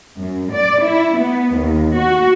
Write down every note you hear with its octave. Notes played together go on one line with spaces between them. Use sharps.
F#2
D5
E4
B3
D#2
F#4